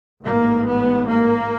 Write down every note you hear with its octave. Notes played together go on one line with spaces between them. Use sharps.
A1 G#2 A#3
B3
A#3